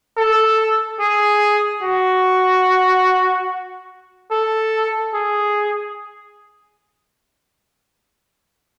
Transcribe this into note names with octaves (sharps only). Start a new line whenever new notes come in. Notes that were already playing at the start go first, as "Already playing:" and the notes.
A4
G#4
F#4
A4
G#4